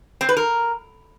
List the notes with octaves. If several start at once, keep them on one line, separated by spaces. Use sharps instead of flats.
C4
B4
A#4